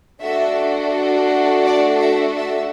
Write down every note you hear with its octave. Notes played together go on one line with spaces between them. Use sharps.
A3 D4 F#4 A4 E5
D5
E5
E5